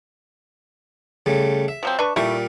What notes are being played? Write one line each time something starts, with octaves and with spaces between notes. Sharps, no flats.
C#3 G3 A3
E5
F3 F#3 C4
D4 B4 C#6
A#2 G3 A3 E4 A#4 C#6